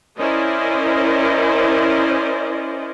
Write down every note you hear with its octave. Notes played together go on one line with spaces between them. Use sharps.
C#4 E4 A#4 C5 D5 D#5